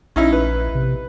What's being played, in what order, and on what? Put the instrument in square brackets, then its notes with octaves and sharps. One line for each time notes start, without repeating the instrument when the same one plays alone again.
[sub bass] A#1 [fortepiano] C#4 D#4 E4
[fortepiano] B4
[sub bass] C3